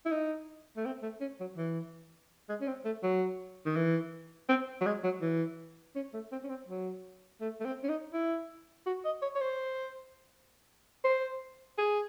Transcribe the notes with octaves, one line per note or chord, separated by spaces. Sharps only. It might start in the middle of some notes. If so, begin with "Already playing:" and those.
E4
D#4
A3
C4
A3
C#4
F#3
E3
G#3
C#4
C4
A3
F#3
D#3
E3
C4
F#3
G#3
F#3
E3
C#4
A3
C4
C#4
C4
F#3
A3
A3
C4
C#4
D#4
E4
F#4
D#5
C#5
C#5
C5
C5
G#4